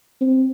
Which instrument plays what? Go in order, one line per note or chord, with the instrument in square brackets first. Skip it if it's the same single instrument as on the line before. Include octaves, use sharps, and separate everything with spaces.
[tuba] C4